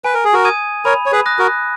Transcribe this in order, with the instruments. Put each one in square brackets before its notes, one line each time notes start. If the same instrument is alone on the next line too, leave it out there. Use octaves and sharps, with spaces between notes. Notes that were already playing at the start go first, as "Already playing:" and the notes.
[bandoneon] B4 [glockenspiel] G#5
[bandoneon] A#4
G#4
F#4 A#4
[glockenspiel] D#6 G#6 D#7
[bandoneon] A#4 C#5 [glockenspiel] B5
[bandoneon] C#5
G#4 B4
[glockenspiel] D#6 F#6 A#6
[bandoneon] F#4 A#4